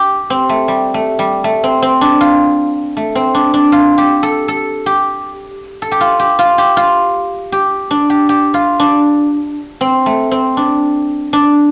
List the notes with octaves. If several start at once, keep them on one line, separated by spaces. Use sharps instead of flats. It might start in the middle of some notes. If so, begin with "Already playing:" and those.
Already playing: G4
C4
A3
G3
A3
G3
A3
C4
C4
D4
F4
A3
C4
D4
D4
F4
G4
A4
A4
G4
A4
G4
F4
G4
F4
G4
F4
G4
D4
G4
G4
F4
D4
C4
A3
C4
D4
D4